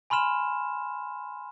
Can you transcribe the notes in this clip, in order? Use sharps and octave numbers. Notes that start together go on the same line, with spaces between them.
G#5 B5 C6 F6 E7